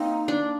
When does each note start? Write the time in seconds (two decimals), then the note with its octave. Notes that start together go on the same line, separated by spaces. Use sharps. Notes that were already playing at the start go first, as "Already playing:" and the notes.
Already playing: A#3 C4 D#4
0.28 D4